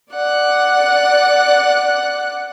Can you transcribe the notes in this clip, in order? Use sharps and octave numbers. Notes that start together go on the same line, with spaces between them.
D5 F#5 F#6